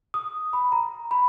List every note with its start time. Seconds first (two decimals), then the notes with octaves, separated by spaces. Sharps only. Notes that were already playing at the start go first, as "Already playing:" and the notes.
0.14 D#6
0.53 B5
0.72 A#5
1.11 B5